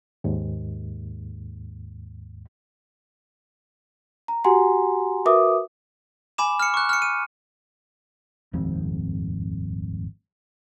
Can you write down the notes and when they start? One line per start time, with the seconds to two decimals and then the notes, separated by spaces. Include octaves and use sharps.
0.24 D#2 G#2
4.28 A#5
4.44 F#4 G4 F#5 G#5 A#5 C6
5.26 F#4 A#4 B4 E5 D6 D#6
6.38 G#5 B5 D6 E7
6.59 F6 C#7
6.74 C#6 F#6
6.89 F6 C#7
7.02 D#7
8.53 D#1 G#1 F2 G#2